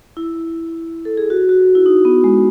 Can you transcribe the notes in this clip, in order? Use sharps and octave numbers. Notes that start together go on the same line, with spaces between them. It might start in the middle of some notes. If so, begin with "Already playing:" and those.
E4
A4
G#4
F#4
F#4
E4
D#4
B3
G#3